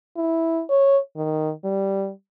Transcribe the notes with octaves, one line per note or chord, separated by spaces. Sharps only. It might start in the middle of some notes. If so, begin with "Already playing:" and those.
E4
C#5
D#3
G3